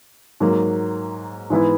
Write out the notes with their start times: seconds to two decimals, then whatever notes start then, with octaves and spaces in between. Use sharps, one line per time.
0.40 G#2 F#3 A#3
1.50 G#2 E3 B3 E4